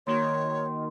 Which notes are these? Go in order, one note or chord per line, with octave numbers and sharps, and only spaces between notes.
D#3 A#3 F#4 C#5 C6